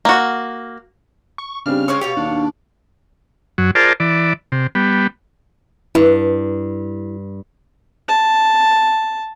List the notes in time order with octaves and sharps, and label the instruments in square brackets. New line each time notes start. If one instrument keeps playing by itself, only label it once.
[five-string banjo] A#3 F#4
[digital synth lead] C#6
[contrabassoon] C#3 [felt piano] G3 C4 D4 [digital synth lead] F6
[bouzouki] G#3 C4 C#5 [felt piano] C#6
[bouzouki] B2 C#5 F5 [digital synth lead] G4
[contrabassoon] D#2 [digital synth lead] D4
[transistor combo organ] F#2 F#3
F4 G#4 A#4 C5 D5 A5
E3 D5
C3
G3 B3
[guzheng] G2 [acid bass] E4
[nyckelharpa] A5